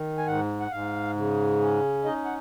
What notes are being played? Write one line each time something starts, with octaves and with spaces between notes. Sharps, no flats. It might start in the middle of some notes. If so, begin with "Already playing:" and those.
Already playing: D#3
G#5
G#2 F#5
F#5
G#2 F5
C#3
C#4
D#4 D#5
F#5